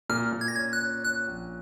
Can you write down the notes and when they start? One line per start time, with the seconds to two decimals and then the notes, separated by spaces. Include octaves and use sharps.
0.09 A#2 F6
0.33 A#2
0.41 G#6
0.48 A#6
0.56 C#4 G#6
0.73 F#6
0.80 C#4
1.04 C#4 F#6
1.28 A#1